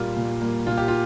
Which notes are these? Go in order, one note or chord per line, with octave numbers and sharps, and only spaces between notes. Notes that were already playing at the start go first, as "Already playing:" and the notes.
Already playing: A#2 G3 A#3 F4
A#2
G3 A#3
A#2 F4
G4
F4